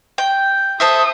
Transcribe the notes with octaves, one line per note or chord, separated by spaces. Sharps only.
G5
A4 C5 E5 D#6